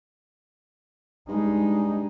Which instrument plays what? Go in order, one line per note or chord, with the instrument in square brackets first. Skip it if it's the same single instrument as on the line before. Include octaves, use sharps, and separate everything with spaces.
[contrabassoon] G2 [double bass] G#3 D#4